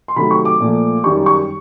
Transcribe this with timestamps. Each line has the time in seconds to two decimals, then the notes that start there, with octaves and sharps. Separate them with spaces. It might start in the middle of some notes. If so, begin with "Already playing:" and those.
0.08 C6
0.16 C3 D#3 F#3 A3 B5
0.31 C#6
0.45 D6
0.60 A#2 F3 A3
1.04 F#2 D#3 G3 C#6
1.26 C#6